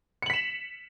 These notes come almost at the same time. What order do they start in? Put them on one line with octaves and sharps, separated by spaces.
C#7 F#7 B6 E7